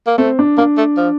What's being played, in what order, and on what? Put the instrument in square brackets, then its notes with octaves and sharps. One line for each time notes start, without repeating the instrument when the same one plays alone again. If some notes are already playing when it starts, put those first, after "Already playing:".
[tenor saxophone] A#3
[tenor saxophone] A3 [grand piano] C4
[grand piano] D4
[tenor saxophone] A#3 [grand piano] D4
[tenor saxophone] A3
F3